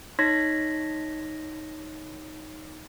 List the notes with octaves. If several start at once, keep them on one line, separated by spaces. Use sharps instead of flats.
D#4 C#5 C6 G#6 A#6 B6